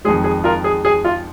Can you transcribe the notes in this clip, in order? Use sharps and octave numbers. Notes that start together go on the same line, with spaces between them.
F2 D#3 G#3 G#4
G#4
F4 A#4
G#4
G#4
F4